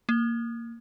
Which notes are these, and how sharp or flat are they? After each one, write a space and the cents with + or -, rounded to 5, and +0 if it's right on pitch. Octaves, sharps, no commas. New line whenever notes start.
A#3 -10